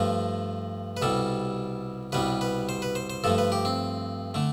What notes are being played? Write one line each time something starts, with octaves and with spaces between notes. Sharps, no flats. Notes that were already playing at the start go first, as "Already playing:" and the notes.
Already playing: G2 F3 A3
B4
C2 B2 G3 A4
C2 B2 G3 B4
B4
C5
B4
C5
C5
G2 F3 A3 A4
B4
G4
C4
D3 A3